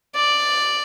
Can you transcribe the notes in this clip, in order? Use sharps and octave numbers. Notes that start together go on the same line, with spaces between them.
D5